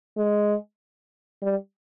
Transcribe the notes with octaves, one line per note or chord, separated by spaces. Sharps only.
G#3
G3